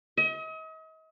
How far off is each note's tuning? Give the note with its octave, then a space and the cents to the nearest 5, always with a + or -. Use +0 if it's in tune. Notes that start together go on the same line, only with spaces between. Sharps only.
D#5 +40